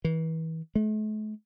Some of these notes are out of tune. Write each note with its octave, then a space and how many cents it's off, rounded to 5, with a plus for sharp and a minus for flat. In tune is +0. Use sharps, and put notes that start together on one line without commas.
E3 -35
A3 -45